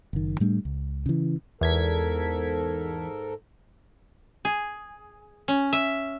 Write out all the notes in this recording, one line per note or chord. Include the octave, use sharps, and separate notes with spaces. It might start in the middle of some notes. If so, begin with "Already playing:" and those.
F#1 D#3
A2 G3 A3 D4
C#2
C#3 E3
E2 G#2 A4 A#4 G#6 B6
G#4
C#4
E5